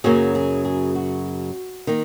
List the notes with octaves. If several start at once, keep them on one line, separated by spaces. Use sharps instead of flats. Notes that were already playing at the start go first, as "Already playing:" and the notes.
F#2 C#3 F#3 A#3 G#4
G#4
G#4
F#4
D#3 A#3